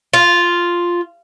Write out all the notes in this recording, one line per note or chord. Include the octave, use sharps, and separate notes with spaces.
F4